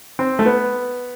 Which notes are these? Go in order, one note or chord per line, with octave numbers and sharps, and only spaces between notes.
C4
A3
B3